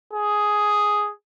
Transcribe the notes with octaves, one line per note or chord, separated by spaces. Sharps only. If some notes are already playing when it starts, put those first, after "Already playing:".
G#4